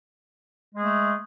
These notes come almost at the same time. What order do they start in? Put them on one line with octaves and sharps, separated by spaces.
G#3 G#4 A3